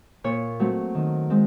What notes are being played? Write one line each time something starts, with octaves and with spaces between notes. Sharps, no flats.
A#2 C#5
F#3 A3 C4
D#3
G#3 C4